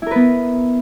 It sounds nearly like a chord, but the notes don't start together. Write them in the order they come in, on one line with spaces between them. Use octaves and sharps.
E4 A#4 B4 B3